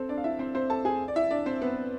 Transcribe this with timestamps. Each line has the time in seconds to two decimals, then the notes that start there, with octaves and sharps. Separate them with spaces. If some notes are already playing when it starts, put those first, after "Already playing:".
Already playing: C4 A4 C5
0.09 D4 D5
0.18 F5
0.24 E4 E5
0.39 C4 C5
0.55 C4 C5
0.70 A4 A5
0.85 G#4 G#5
1.08 D5
1.16 E4 E5
1.31 D4 D5
1.46 C4 C5
1.61 B3 B4